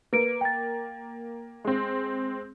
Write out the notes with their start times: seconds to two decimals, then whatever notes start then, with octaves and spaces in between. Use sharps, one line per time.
0.13 A#3 B4 D7
0.41 G5 A6
1.65 G#3 C4